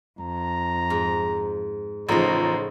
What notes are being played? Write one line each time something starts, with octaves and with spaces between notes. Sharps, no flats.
F2 A#5
G#2
A1 A2 C#3 F3 D#4 C5 A#5